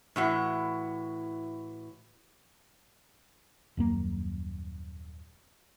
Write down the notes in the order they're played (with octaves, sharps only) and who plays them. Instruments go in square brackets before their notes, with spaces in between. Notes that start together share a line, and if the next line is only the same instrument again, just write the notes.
[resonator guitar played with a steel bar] A2 E3 F#4
[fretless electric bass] D#1 F#2 A#3